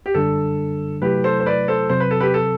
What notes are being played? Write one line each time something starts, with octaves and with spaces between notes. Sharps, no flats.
G4
F#2 D3 G3 D4 A4
C3 F#3 A3 E4 G4 B4
A4 C5
C5
B4 D5
A4 C5
C3 F#3 C4 C5
B4
A4
G4 B4
A4